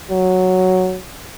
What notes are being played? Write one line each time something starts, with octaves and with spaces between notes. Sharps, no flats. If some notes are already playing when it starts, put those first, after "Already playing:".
F#3